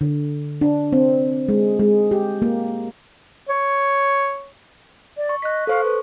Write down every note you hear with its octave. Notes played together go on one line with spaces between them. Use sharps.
D3
D4
C4
G#3
G#3
G4
A#3
C#5
D5
C#6
D#5 F#6 B6
A4 C5 F5 C#6
B4